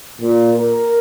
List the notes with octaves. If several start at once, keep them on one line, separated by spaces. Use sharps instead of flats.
A#2
A#4